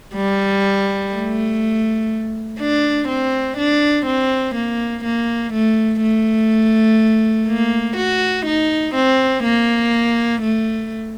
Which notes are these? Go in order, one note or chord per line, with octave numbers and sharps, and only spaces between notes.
G3
A3
D4
C4
D4
C4
A#3
A#3
A3
A3
A#3
F#4
D#4
C4
A#3
A3